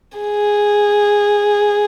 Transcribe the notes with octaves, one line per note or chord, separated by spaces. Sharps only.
G#4